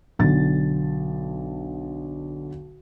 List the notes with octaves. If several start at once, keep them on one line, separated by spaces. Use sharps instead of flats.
B1 D3 A6